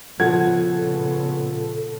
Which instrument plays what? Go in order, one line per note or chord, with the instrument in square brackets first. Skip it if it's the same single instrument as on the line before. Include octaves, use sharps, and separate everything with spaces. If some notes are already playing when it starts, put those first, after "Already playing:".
[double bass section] A#2 C#3 B3 [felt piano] F3 F#5 G#6 [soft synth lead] A4